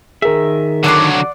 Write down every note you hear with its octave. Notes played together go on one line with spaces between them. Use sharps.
D#3 G#4 A#4 E5
D3 F#3 D5 F#5 C6